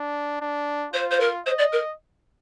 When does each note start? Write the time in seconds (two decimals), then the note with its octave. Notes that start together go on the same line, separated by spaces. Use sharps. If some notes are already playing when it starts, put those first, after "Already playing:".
Already playing: D4
0.41 D4
0.93 F4 C5
1.11 C5
1.20 A#4
1.46 C5 D#5
1.58 D5
1.72 A#4